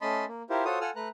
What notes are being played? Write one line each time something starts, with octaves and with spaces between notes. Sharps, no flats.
A3 C#4 D#5 A5 B5 C6
A#3
E4 F4 G4 A#4 C5
F4 F#4 A4 C5 C#5 D#6
F4 A4 F#5 G#5 E6 F6
A3 B4 A#5 F#6